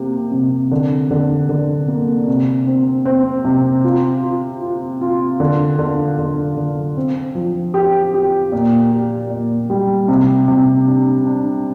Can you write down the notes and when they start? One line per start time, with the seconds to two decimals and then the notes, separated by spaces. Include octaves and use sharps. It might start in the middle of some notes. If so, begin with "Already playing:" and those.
Already playing: C3 A#3 G4
0.32 C3
0.71 D3
1.11 D3
1.49 D3
1.88 A#3
2.28 C3
2.67 C4
3.05 C4
3.45 C3
3.84 F4
4.24 F4
4.61 F4
5.01 F4
5.40 D3
5.79 D3
6.19 D3
6.57 D3
6.97 C4
7.35 F3
7.74 G4
8.14 G4
8.52 A#2
8.92 G4
9.30 A#2
9.70 G3
10.08 C3
10.48 C3
10.88 D4
11.26 D4